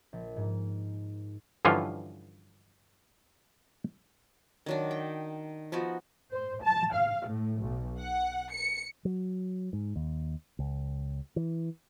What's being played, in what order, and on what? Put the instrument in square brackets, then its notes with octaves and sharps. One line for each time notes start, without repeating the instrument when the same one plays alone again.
[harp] A#1
G#2
[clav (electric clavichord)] G2 D3 E3 F3 C#4 F4
[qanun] D#3 F#3 D4
G5
F3 B3 D#4 F#4
[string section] C5
A5
F5
A2
B1
F#5
C#7
[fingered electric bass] F#3
G#2
D#2
C#2
E3